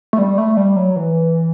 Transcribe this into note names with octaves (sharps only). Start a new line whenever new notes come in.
A3
G3
A3
G3
F#3
E3